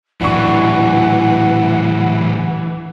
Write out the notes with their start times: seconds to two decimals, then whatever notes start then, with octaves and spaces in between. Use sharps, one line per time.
0.21 D#1 A2 E3 F#3 D4 F#5 C#6